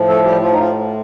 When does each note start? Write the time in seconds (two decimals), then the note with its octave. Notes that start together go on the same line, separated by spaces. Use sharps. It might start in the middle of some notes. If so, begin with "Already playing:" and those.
Already playing: A2 F3
0.08 A3 A4
0.25 G3 G4
0.42 F3 F4
0.53 D#4
0.59 F3 F4